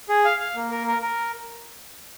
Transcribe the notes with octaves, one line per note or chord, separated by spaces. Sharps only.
G#4
F5
F5
A#3
A#4
A#4
A#4